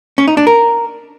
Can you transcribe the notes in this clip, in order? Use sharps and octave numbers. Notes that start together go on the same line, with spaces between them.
C#4
D#4
D4
A#4